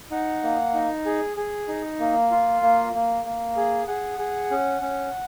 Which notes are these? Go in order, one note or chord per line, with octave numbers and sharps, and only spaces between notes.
D#4 F#5
A#3
D#4
G#4
G#4
D#4
A#3
F4
A#3
A#3
A#3
G#4
G#4 F#5
G#4
C#4
C#4